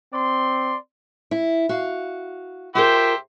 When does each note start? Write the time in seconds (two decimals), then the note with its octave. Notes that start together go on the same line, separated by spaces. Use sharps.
0.13 C4 D5 C6
1.31 E4
1.69 F#4 F5
2.75 F4 G4 G#4 A#4 C5 E5